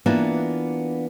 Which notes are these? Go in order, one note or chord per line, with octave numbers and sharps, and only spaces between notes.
E3 A#3 B3 D4 F4